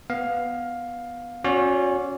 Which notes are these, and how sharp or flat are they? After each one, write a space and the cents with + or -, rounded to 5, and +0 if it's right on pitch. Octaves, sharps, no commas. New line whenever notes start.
B3 +0 F5 +10
C#4 -10 F#4 -25 D5 -35